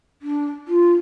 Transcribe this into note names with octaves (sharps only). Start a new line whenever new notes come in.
D4
F4